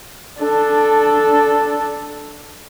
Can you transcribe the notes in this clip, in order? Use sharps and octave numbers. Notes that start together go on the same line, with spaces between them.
D4 A4